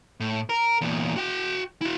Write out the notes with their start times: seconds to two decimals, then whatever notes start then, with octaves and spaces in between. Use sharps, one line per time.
0.20 A2
0.49 A#4
0.81 E2 A#2
1.16 F#4 G5
1.82 E4 F#4